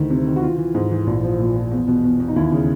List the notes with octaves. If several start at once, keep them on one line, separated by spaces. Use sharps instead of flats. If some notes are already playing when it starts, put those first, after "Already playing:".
Already playing: D2 D#3 E4
C3
D#3
F#4
E3 F4
E3
G#2
E3
A#1
F3
A#2
F3
E2
B2
E2
E2
D#4
D#2 E4
C#3